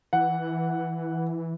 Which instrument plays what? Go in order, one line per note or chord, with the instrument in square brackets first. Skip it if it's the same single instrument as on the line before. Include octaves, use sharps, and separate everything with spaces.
[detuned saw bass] E3 [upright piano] F#5